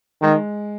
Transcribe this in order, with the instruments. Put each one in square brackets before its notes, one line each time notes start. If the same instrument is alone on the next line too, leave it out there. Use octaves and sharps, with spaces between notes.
[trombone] D#3 [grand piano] G#3